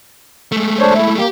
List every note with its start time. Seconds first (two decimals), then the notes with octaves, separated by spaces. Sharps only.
0.52 G#3 A3
0.79 D4 C5 C#5
0.95 E4
1.18 A#3 G4